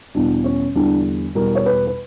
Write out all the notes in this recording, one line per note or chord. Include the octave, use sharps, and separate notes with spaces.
E2 B2 G3 D4
C#4
E2 D3 G3 D4
E2 B2 G3 A#4
C#5
B4
B4